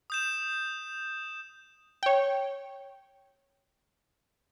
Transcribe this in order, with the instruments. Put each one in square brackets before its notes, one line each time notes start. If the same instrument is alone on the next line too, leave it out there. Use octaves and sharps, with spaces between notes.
[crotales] D#6 G6 E7
[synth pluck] C#5 G5